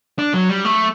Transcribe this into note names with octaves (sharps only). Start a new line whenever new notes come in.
D4
F#3
G3
A3